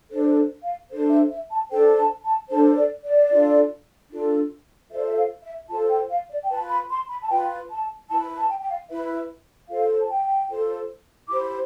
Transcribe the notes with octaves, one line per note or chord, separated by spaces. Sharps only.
D4 A4 C5
F5
D4 A4 C5
E5
E5
A5
D4 A4 C5 G5
A5
A5
D4 A4 C5 A5
D5
D5
D4 F4 A4
D4 F4 A4
F4 A4 C5 E5
D5
E5
F5
E5
F4 A4 C5 A5
G5
F5
D5
G5
F4 B4 A5
B5
C6
B5
A5
F4 B4 G5
A5
E4 B4 A5
A5
G5
G5
F5
E4 B4 E5
F4 A4 C5 F5
A5
G5
F4 A4 C5
E4 G4 C5 D6